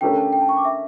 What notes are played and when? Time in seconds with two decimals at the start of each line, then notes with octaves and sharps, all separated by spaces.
0.01 D3 A3 C#4 G4 A#4 G5
0.17 A5
0.33 G5
0.41 A5
0.49 C#6
0.57 D6
0.65 E5